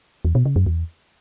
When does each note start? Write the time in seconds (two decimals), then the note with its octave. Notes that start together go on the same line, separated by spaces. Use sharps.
0.25 E2
0.35 B2
0.46 C#3
0.56 F#2
0.66 E2